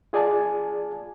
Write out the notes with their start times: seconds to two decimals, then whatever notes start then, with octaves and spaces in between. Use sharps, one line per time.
0.13 F4 G#4 D5 G#5 A5